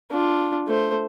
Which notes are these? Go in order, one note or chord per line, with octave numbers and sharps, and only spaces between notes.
D4 F4
A3 C5